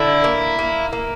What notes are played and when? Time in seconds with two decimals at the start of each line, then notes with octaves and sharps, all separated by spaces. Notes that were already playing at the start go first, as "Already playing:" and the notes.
Already playing: D3 E4
0.24 A#3
0.59 A#3
0.93 A#3